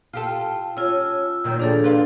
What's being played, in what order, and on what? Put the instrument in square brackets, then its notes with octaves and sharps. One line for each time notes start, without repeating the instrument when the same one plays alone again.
[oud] F4 G4 A4
[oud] C#4 [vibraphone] F4 E6
[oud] A#2 D#3 F#3
[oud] A#2 F3 D5 [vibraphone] D4 G#4 A4
[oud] F4 B4